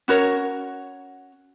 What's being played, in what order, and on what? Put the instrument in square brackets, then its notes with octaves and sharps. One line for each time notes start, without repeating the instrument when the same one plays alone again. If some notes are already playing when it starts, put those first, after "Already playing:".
[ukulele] C#4 F#4 A#4 C#5